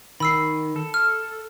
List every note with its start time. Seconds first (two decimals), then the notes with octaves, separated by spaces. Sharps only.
0.20 D#3 B5 E6 C7
0.76 A4
0.94 F6